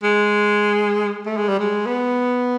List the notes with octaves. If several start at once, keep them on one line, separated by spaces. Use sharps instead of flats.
G#3
A3
G#3
G3
G#3
B3